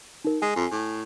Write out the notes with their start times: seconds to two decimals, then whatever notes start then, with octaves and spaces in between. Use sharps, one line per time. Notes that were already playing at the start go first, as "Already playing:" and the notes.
0.25 D#4 A#4
0.42 G#3 G#5
0.56 F2
0.71 A2